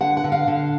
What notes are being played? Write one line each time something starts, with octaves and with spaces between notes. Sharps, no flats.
D3 F#5
F#5
D3
F5
D3